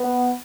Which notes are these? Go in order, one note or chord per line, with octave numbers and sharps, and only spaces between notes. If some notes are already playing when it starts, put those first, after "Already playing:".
Already playing: B3